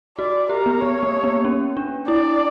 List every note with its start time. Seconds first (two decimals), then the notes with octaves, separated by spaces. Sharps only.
0.18 F#4 D5
0.50 G4 A#4
0.66 B3
0.81 B3 C#5
1.03 A#3
1.24 B3
1.45 C#4
1.77 D4
2.08 E4 D5